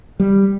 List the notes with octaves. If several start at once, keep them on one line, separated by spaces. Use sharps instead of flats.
G3